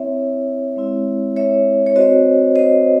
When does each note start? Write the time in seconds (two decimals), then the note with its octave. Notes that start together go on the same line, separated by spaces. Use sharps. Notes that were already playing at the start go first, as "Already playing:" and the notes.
Already playing: C4 E4 C#5 E5
0.76 G#3 C4 E4
1.36 C#5 E5
1.86 C#5
1.96 C4 F#4 C5 D#5
2.56 C5 D#5